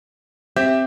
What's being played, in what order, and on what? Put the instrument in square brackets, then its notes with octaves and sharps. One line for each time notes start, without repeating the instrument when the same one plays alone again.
[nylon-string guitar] C4 [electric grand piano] G4 E5 G6